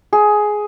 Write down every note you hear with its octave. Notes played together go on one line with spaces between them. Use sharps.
G#4